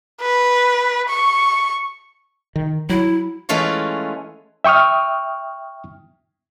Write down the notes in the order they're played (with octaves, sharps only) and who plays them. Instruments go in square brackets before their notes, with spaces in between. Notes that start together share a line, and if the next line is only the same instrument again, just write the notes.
[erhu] B4
C#6
[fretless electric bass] D#3
[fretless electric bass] F#3 [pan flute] E4
[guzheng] E3 G#3 A3 C#4 F4 C#5
[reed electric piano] E5 G5 C#6 D#6 F6